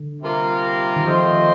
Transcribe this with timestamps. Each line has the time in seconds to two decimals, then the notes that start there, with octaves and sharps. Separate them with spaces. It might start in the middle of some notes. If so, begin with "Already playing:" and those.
Already playing: D3
0.22 C3 G3 A#3 F4 A#4
0.96 D#3
1.05 F3 A3 C4 F4 C5 D#5